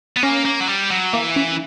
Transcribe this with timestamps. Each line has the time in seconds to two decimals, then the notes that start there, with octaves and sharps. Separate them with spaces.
0.17 B3
0.23 A#3 C#4
0.46 A#3
0.61 F#3
0.68 G3
0.91 F#3
1.13 E3 A#3
1.36 C#4